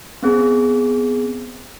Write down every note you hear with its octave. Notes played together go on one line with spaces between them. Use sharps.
B3 C4 G#4